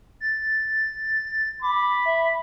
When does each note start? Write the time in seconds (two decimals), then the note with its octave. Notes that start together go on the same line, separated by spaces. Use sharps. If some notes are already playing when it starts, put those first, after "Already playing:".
0.20 A6
1.62 B5 D6
2.06 E5